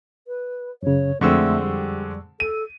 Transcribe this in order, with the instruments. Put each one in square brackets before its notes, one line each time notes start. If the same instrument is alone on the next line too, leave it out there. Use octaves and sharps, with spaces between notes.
[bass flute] B4
[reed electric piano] F#2 C#3 [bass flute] C#5
[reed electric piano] F2 C#6 E6 [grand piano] D3 G#3 C4 [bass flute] A3
[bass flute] G3
[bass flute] A4 [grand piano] D#7